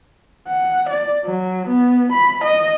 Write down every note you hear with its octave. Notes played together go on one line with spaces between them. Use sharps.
F#5
D5
F#3
B3
B5
D#5